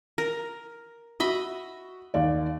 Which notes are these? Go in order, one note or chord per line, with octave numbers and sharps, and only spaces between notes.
A#4
F#4 D#5 E5 B5
D#2 D5